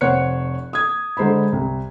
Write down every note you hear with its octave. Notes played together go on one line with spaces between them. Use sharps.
F1 C5 C#5 F#5 F#6 C#7
D#6 G#6
D3 G#3 C5 A#5 B5
C2